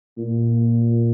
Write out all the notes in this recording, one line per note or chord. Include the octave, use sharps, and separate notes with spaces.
A#2